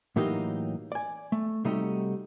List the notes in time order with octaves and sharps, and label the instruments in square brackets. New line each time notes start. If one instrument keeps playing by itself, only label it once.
[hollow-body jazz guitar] A2 E3 F#3 A#3 D#4 G4
D5 G#5
A3
C3 G3 A3 D#4 F#4 G4